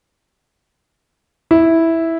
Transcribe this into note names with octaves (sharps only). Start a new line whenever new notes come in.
E4